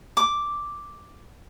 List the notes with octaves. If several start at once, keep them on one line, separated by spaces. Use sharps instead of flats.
D6